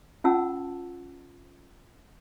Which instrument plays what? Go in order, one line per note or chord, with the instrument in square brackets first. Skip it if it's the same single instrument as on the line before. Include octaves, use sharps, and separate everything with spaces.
[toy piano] C#4 F4 F#5 A5 E6